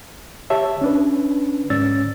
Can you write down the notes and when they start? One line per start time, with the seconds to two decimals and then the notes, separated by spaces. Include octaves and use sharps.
0.50 G4 C#5 E5 A5
0.81 C#4 D4 B4
1.70 G#2 C#4 D5 E6 A6